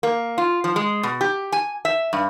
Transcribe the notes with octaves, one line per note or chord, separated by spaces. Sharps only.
A#3
F4
F3
G#3
B2
G4
G#5
E5
G2